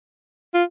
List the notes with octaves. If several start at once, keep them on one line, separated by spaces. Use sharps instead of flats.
F4